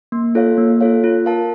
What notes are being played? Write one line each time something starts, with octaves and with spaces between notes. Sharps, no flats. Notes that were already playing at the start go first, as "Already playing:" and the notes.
A#3
F4 A4 C#5 F5
A#3
F4 A4 C#5 F5
F4
A#4 F5 A5